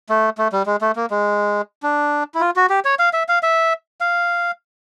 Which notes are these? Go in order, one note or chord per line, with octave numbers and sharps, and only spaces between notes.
A3
A3
G3
G#3
A3
A#3
G#3
D4
E4
F4
F#4
G4
C#5
F5
E5
F5
E5
F5